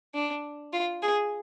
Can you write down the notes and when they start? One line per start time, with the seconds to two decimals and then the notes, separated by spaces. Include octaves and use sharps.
0.14 D4
0.73 F4
1.02 G#4